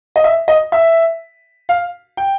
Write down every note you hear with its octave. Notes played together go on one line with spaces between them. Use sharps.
D#5
E5
D#5
E5
F5
G5